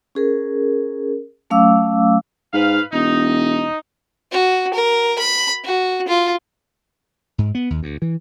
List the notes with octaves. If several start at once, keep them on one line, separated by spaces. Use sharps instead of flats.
C#4 G#4 A#4
F#3 A3 C#4 F5 D6 E6
G#2 B4 F5
E1 D#4
F#4
A#4
B5
F#4
F4
G#2
B3
D#2
D2
E3